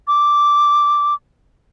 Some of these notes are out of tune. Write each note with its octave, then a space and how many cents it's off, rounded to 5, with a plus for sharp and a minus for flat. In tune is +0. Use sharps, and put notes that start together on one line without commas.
D6 -5